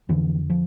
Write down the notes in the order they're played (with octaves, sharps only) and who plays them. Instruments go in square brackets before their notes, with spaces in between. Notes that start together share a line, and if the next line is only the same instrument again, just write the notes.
[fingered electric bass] F2 D3 E3
F3